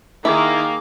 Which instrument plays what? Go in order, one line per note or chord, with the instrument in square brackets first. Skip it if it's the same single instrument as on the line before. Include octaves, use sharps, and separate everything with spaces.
[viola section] D#3 [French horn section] A#3 [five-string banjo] E4 [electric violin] G#4 D6